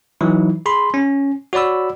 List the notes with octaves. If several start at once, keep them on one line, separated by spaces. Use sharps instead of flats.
E3 F#3 D#4 E4
G#4 B5 C6
C#4
F#4 C#5 D5 B5 E6